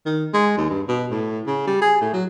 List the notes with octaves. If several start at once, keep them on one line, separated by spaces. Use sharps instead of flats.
D#3
G#3
D#2
G2
B2
A2
C#3
G3
G#4
A2
F#3